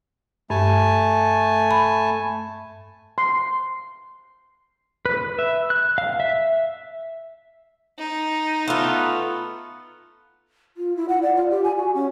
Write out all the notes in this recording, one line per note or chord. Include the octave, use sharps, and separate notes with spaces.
G2 A3 G#5 A5
B5
C6
B4
E5
F#6
F5
E5
D#4
A3 B3 F4
F4
E4
F#5
D5
F4
G4
G#5
F#4
C#4